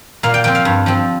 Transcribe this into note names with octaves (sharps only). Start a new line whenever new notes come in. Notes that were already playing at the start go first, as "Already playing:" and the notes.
A#2 F5
G5
F3 C4 G5
F5
G2
F3 C4